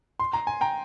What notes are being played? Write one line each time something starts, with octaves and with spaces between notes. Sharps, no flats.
C6
A#5
G#5
G5 A#5